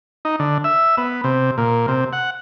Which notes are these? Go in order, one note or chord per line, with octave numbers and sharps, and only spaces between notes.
D#4
D3
E5
B3
C3
A#2
C3
F#5